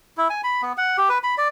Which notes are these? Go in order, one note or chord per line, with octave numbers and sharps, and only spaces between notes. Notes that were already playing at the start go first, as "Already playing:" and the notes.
E4
G#5
B5
B3
F#5
G4
B4
B5
D5